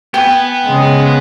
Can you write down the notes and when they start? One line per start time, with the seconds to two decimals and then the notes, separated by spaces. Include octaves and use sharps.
0.14 B3 B4 G5 G#5
0.67 C#3 G#3